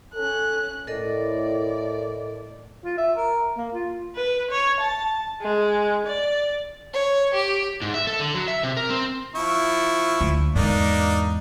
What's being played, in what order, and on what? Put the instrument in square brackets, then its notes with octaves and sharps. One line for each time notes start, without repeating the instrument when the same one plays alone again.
[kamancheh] C#4 F#6 [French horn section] A4
[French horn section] A2 [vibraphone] A4 A#4 D#5 [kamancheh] D5
[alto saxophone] F4
E5
A#4
A#3
F4
[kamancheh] B4
C#5
A5
G#3
D5
[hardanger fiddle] C#5
G4
[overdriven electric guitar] G#2
E5
A4
D3
F#3
E5
C3
A#4
C4
[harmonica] F3 E4 C#6
[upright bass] D2
[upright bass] E2 G#2 [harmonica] A#3 D4 D#4